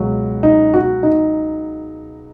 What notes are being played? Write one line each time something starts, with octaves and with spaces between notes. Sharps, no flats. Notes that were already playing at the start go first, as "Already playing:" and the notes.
Already playing: C#2 B2 F#3
D#4
F#4
D#4